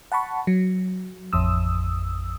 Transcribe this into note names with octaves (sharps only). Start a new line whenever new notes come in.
F#5 A5 B5 C#6
F#3
A1 F2 D#6 E6